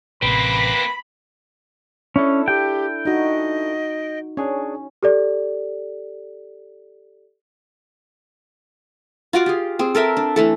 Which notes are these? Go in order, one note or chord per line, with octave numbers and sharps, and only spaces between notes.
A1 C3 A#3 C4 B4 B5
C#4 D4 E4 A4
G4 G5
D#4 F#4 D#5
C#4 D4 G#4 C#5
G4 A4 D5
F4 F#4 D5 F5
G4 G#4
C4 G#4
A4 A#4 E5 G5
D4
E3 A3 A4